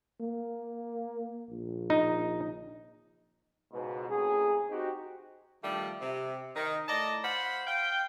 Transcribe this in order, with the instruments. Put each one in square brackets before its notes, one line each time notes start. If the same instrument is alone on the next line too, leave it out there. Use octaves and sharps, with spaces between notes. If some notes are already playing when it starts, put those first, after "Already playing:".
[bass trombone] A#3
A#1
[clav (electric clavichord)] D#4
[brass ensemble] C#2 G#2 B2
A2 C3 A#3 C#4 G#4
C4 D#4 F#4 G4
[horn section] D#3 F3 G3 A3 D4
C3
D#3 D#4
A2 D5 D#5 A5 A#5
C5 F5 F#5 B5 C6
F5 G5